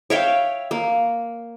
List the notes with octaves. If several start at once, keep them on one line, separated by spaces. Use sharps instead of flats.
C#5 E5 F5 G5
A#3